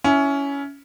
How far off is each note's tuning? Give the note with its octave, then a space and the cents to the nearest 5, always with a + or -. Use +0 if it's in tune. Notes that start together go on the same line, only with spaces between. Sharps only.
C#4 +15 E4 +0